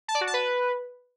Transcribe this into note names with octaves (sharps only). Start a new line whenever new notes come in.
A5
D5
F#4
A5
B4